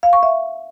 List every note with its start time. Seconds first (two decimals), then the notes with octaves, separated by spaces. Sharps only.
0.03 F5
0.13 C#6
0.23 E5